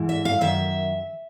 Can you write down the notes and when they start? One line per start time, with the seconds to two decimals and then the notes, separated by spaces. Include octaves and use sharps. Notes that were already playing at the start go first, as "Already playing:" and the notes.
Already playing: G#2 E3
0.09 E5
0.25 F5
0.41 F#2 D#3 E5